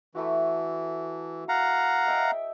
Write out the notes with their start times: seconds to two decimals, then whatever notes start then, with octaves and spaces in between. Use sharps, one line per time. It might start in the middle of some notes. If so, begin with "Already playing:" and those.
0.15 E3 A3 E4 F#4
1.49 F5 F#5 A#5
2.07 D#5 E5 G5